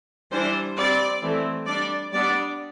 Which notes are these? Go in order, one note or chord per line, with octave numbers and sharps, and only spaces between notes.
E3 G3 D4 C5
G3 C4 D5
E3 A3 C4
G3 D4 D5
G3 B3 D4 D5